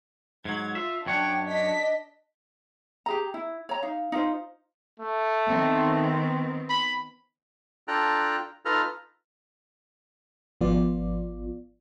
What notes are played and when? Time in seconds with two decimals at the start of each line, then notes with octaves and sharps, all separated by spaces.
0.45 G#2 F#3 G#6
0.75 F4 E5
1.06 F#2 D4 C#5 F#5 G5
1.47 D4 D#5 B6
3.06 G4 G#4 A#5
3.34 E4
3.69 C#5 A#5
3.83 D#4 F5
4.12 D#4 F4 C5
5.00 A3
5.47 D#3 B3 C4
6.70 B5
7.88 D4 F4 A4 G5 A#5 F#6
8.65 D#4 F4 A4 B4 A#5 F6
10.61 G#1 F3 B3 F4 D5